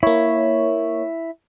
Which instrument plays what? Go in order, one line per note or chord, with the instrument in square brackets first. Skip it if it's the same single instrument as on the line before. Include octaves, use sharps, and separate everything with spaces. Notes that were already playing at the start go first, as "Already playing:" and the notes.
[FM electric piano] A#3 C#5 [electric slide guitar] E4